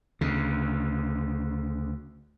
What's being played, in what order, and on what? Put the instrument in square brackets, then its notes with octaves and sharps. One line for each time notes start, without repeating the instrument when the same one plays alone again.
[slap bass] D2 C#3